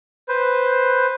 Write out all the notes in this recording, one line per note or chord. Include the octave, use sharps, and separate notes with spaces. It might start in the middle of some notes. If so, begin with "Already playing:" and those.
B4 C5